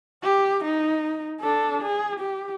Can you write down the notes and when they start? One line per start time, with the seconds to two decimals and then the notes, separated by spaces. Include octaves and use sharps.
0.23 G4
0.65 D#4
1.41 D4 A4
1.82 G#4
2.20 G4